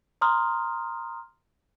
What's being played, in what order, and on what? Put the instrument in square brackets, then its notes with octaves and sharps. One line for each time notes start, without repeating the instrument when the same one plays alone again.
[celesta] A#5 C6 D#6 F6